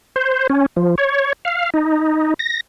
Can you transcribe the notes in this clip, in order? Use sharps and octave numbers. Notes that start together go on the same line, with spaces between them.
C5
C#4
F3
C#5
F5
D#4
A#6